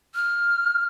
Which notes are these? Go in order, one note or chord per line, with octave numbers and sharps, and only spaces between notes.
F6